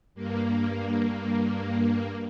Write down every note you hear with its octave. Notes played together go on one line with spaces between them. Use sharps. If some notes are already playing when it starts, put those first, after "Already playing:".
G2 A#3